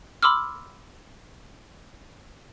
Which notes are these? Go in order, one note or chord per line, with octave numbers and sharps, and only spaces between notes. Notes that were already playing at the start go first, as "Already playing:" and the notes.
B5 C6 D6 E6 F6